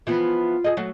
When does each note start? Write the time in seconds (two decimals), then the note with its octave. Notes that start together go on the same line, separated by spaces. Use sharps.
0.07 E3 F3 B3 F4
0.64 G#4 D#5
0.77 F#3 A3 F#4